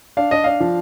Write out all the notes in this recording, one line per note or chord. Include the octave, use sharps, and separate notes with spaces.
D4 F5
D4 D#5
D4 F5
F3